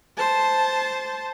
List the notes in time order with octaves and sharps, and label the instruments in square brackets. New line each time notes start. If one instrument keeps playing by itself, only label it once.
[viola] C5 A5